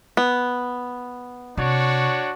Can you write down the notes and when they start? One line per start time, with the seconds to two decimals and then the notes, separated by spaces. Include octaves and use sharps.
0.17 B3
1.58 C3 D4 F#4 C#5